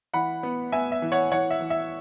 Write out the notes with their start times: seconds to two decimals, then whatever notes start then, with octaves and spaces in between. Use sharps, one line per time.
0.14 E3 F#5 B5
0.43 B3
0.72 B3 E5 G#5
0.92 E5
1.02 E3
1.12 C#5 F#5
1.32 E3 C#5 F#5
1.50 E5
1.60 E3
1.70 E5